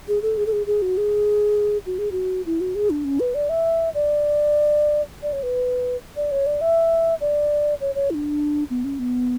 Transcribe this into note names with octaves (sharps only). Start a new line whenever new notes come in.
G#4
A4
G#4
A4
G#4
G#4
F#4
G#4
F#4
G#4
F#4
E4
F#4
G#4
D4
C#4
B4
D5
E5
D5
D5
C#5
B4
D5
C#5
D5
E5
D5
C#5
C#5
E4
D4
B3
C#4
B3